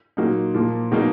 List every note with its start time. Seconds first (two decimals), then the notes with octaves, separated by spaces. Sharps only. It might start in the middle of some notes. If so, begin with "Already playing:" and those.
0.17 A#2 F#3 A#3 D#4
0.55 A#2 F3 A#3
0.92 B2 F#3 A#3 D#4